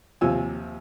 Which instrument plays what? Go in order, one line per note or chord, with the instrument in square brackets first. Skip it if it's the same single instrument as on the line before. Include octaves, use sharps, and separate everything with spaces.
[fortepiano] D#2 C3 F3 F4 G#5 E6